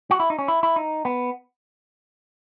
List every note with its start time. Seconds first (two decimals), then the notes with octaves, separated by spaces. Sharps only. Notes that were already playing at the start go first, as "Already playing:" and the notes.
0.11 F#4
0.20 E4
0.30 D#4
0.39 C#4
0.48 E4
0.63 E4
0.76 D#4
1.05 B3